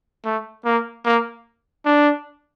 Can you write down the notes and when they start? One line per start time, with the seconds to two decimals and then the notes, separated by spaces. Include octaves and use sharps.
0.25 A3
0.65 A#3
1.05 A#3
1.85 D4